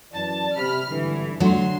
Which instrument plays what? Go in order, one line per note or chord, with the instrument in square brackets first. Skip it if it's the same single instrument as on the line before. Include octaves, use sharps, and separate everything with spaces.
[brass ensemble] F#2 E3 D5 [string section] A5
[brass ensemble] C3 [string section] B5 F6
[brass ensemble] G#1 G2 D3 [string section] E3
[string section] D2 C6 [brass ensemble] D3 [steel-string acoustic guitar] F#3